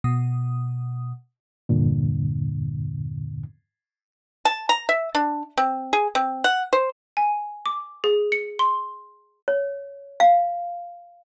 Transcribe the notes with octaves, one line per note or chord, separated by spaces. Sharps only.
B2 D#6
E2 G2 A#2 D3
A5
A#5
E5
D4
C4
G#4
C4
F#5
C5
G#5
D6
G#4
C#7
C6
C#5
F5